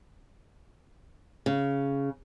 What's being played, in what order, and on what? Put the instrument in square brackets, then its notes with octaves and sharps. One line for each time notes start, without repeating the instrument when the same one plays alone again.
[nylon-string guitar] C#3